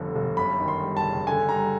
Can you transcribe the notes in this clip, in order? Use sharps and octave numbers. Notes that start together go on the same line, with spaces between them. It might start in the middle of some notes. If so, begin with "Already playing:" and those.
Already playing: G1 F2 D3
G1
F#2 B5
D#3
C6
G3
A5
F#1
D3 G#5
G3 A#5